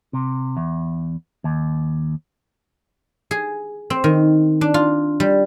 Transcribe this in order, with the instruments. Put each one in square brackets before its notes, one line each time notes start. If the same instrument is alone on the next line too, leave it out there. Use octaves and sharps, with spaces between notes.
[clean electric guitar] C3
E2
D#2
[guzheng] G#4
C4
D#3
D4
F4
G3